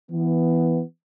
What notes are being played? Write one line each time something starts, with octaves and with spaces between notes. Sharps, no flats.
E3 B3